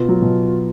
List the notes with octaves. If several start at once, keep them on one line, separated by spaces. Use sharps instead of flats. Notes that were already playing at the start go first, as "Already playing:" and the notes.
Already playing: B2 B3 F4
F#3
B2